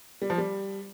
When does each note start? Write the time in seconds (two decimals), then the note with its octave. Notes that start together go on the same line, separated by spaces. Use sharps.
0.22 G3
0.30 F3
0.38 G3